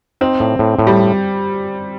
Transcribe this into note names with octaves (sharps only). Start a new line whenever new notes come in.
C4 D#4
A2
A2
A2
G3